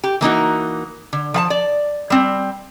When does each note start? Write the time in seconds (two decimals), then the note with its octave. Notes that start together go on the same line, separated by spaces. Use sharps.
0.04 G4
0.21 E3 A#3 D#4 F#4
1.13 D3
1.34 F3 F5 A5
1.50 D5
2.10 G3 C4